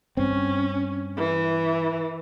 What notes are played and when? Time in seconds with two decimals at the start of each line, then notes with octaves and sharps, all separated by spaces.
0.17 G2 C4 C#4
1.17 E3